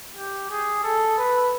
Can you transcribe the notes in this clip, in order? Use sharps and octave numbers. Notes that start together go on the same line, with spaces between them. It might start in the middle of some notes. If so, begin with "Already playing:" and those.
G4
G#4
A4
B4